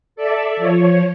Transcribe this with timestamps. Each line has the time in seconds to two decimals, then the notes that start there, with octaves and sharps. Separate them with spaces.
0.16 A4 D5 E5
0.57 F3 C#5